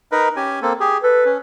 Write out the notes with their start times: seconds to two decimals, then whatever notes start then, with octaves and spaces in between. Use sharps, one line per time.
0.12 D#4 A#4 B4
0.36 C#4 G4 G#5
0.62 A#3 C4 A4
0.80 G4 G#4
1.03 A4 B4
1.25 C#4